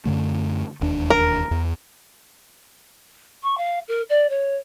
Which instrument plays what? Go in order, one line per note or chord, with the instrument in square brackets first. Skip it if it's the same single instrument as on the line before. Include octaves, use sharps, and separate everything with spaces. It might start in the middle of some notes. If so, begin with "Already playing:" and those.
[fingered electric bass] F#2 D3 A3
E1 D#2 D4
[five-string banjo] A#4
[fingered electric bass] E2
[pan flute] C#6
F5
A#4
D5
C#5